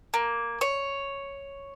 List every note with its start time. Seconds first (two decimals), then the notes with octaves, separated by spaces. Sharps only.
0.14 A#3
0.61 C#5